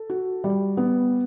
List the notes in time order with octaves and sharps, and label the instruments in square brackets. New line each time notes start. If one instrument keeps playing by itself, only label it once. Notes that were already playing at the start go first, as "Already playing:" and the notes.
Already playing: [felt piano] A4
F#4
G3
B3